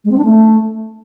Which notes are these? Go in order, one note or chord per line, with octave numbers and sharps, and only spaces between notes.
G#3
C4
D4
A3